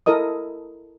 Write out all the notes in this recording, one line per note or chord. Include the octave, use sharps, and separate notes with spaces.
E4 A4 A#4 D#5 D#6